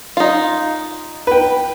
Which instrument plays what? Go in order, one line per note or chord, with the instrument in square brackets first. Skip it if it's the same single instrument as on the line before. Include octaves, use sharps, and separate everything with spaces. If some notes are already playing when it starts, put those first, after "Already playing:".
[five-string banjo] D#4 F4
[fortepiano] B4 G5